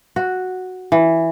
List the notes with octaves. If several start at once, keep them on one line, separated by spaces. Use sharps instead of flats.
F#4
E3